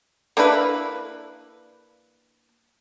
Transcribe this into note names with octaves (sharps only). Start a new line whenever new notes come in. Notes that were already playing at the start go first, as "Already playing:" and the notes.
A#3 D4 E4 B4